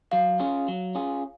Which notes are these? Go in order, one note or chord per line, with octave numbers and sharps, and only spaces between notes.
F#3 F5
C#4 F4 G#4
F#3
C#4 F4 G#4